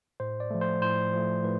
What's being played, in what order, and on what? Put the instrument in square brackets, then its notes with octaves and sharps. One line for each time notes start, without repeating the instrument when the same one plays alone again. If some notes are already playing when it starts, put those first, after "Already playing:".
[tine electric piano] A2 C5
D5
F3 A3
C5
A2 C5
F3 A3
A2 B4